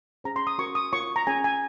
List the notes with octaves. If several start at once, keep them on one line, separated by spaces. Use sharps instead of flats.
C#4 G#4 C5 A#5
C6
D#6
C#4 F#4 A#4 C#6
D#6
F4 A#4 C#5 C#6
A#5
C#4 G#4 C#5 G#5
G#5